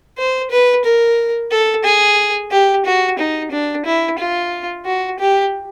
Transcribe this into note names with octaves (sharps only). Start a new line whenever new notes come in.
C5
B4
A#4
A4
G#4
G4
F#4
D#4
D4
E4
F4
F#4
G4